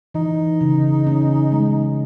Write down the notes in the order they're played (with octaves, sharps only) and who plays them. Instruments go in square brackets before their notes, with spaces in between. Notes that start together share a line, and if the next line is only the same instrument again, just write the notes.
[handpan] E3 [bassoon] D#4
[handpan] C#3
C#4
G#3